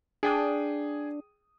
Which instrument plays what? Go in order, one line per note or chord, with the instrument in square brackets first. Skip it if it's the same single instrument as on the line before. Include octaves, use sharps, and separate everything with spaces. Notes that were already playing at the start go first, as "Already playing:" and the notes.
[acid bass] D4 [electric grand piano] G#4 G5 D#6